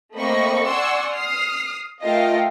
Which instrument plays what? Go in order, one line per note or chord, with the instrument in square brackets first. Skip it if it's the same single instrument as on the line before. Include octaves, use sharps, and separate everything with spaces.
[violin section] A3 A#3 C4 D#5 B5 C#6
D5 F#5 G#5 C6 C#6 E6
D#6 F6 C7
A3 F4 A#4 D#5 F5 G5